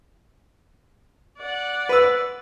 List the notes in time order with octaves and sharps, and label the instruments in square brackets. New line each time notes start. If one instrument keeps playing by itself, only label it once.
[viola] D5 F#5
[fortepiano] B4 E6